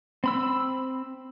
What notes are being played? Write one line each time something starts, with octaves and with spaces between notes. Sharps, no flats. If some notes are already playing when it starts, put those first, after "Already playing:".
C4 B5 E6